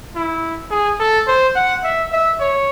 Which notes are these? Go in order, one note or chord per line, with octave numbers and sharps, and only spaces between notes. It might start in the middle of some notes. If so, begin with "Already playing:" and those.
E4
G#4
A4
C5
F#5
E5
E5
C#5